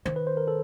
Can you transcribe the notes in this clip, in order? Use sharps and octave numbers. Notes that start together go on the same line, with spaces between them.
D#3 C5
B4
C5
A#4
A4